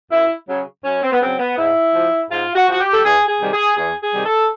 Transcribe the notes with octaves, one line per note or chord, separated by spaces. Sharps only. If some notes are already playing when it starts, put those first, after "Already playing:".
F#2 E4
C#3 F#3
F#2 C#4
C4
B3
C#3 F#3 C4
B3
G#2 E4
F3
G#2 F4
F#4
F3 F#4
G4
A4
E2 G#4
G#4
C3 D#3 G3
G#4
E2 G#4
G#4
C3 D#3 G3
A4